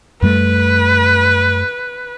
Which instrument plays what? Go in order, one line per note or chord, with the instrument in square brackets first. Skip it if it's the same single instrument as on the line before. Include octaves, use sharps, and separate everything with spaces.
[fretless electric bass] F#2 G3 A3 [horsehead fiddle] B4